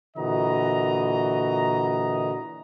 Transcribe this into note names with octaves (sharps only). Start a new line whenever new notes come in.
A#2 D3 E3 F#4 D#5 A#5